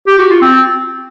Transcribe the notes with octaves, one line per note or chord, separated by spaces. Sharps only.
G4
F#4
F4
C4